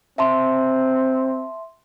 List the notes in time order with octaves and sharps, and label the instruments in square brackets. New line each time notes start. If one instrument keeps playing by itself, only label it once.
[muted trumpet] C4 [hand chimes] E5 A5 C6